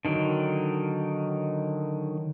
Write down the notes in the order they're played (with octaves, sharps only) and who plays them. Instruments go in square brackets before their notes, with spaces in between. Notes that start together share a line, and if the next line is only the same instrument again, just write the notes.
[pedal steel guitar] D3 D#3 F#3